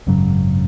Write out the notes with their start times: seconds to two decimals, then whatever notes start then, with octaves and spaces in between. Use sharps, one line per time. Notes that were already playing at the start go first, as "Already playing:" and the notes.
0.07 G#1 F#2 C#3 F#3